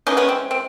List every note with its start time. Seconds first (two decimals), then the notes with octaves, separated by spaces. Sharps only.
0.07 E3 G#3 B3 C#4 D#4
0.17 B3 C#4
0.29 C4
0.51 C4